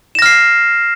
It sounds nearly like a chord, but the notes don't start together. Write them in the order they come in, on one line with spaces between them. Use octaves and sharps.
E7 A#6 F6 C7